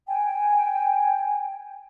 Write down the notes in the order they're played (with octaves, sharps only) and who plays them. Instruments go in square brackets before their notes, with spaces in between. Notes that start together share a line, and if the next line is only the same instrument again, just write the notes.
[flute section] G5 G#5